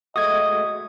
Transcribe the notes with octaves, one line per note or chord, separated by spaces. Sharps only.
G#3 A3 F#4 D#5 D#6 G#6